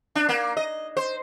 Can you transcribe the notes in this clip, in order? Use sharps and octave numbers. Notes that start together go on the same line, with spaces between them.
D4
A#3
D#5
C5